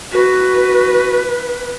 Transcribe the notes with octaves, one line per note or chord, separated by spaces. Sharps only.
F#4 B4